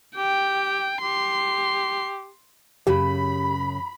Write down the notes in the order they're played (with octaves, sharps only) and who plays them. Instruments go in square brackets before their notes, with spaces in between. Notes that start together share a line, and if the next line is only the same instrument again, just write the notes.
[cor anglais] G4 [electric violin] G5
[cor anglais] G4 [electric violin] C6
[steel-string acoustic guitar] F#2 C#3 [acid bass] G4 [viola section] B5